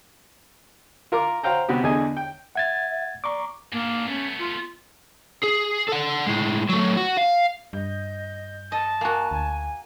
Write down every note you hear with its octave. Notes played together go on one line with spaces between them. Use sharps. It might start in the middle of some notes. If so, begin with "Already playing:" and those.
F4 A#4 A#5 D6
F#4 C5 F5 G5 A#5
C3 B3 F#4 G4
E2 D3 G#4 D#5 G#5
G5
E5 F#5 G#6 A6
D5 A#5 C#6 D6
G#2 A#3 D4
A3 B3 C#4
F4
G#4
A4 F#5
A2 G#3
F#3 A3
F#4
F5
G2 D#5 G6
D#5 A5
A#3 F#4 G#5
D2 G#5